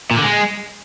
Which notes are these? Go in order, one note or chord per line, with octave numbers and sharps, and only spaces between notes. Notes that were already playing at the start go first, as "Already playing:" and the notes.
A#2
D3
G#3